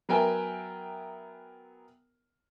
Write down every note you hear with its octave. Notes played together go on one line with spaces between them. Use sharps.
F#3 B3 A#4 E5 G5 G#5